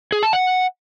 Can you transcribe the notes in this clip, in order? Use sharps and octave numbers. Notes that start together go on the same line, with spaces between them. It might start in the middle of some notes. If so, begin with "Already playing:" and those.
G#4
A5
F#5